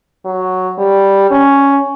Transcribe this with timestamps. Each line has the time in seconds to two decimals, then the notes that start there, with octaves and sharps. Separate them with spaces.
0.25 F#3
0.78 G3
1.31 C#4